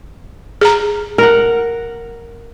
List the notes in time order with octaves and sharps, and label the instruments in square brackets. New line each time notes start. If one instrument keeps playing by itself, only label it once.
[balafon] G#4 A#5
[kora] A#4 F#5